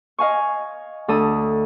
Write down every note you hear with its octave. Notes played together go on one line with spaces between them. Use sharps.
D#5 F5 G#5 C#6
D2 A4 D#6